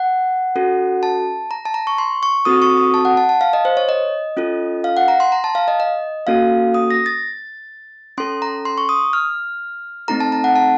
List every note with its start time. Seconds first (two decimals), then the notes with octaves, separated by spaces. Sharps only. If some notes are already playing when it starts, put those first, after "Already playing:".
Already playing: F#5
0.56 C#4 F#4 A4
1.03 A5
1.51 A#5
1.66 A5
1.74 A#5
1.87 C#6
1.98 C6
2.23 C#6
2.45 C4 F#4 A4 D#6
2.62 C#6
2.77 D#6
2.94 A5
3.05 F#5
3.17 A5
3.29 A5
3.41 F5
3.53 D#5
3.65 C5
3.77 C#5
3.89 D#5
4.37 C#4 F4 A4
4.84 F5
4.97 F#5
5.08 A#5
5.20 C6
5.32 A#5
5.44 A5
5.55 F5
5.68 D#5
5.80 D#5
6.27 A#3 C#4 F#4 A4 F5
6.74 D#6
6.91 A#6
7.06 A6
8.17 C#4 A4 C6
8.42 A#5
8.65 C6
8.78 C#6
8.89 D#6
9.13 F6
10.08 A3 C4 D#4 A4 A#5
10.20 A5
10.32 A#5
10.44 F#5
10.56 A5